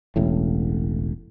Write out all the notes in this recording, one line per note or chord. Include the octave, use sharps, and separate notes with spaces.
E1 A1 A2